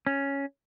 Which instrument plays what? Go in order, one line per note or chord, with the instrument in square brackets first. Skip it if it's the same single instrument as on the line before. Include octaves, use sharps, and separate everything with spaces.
[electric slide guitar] C#4